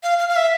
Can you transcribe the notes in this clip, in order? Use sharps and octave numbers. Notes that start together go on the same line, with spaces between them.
F5
F5
F5
E5